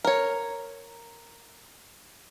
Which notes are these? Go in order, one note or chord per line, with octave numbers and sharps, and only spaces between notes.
A#4 C#5